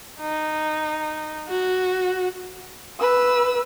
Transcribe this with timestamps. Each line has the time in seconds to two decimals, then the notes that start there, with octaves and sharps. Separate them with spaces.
0.21 D#4
1.48 F#4
3.00 B4 E6